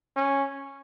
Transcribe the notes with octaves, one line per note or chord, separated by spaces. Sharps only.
C#4